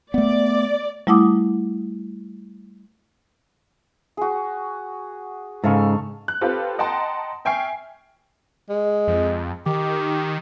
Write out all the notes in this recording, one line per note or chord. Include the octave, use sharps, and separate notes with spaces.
A3 B3 D5
G3 A3 E4 F#5 D6 D#6
F#4 G#4
G#2 C#3 A4 F5 C#6
F#6
C4 F4 G4 A4 B4
D#5 F#5 G5 A5 A#5 C6
E5 G5 G#5 C#6 F6 C7
G#3
F2
D#3 G4